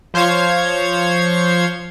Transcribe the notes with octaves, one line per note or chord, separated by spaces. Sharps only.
F3 C5 C#5 F5 G#6